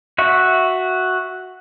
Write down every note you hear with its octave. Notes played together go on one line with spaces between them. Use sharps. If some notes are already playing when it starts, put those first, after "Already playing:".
F#4 E5 C#6